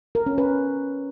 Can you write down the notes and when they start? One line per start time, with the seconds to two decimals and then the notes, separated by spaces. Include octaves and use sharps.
0.15 A#4
0.26 C#4
0.38 B4